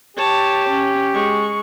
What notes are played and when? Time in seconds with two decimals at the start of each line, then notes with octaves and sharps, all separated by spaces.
0.17 G4 C#5 A5
0.69 C#4
1.13 G#3 C#6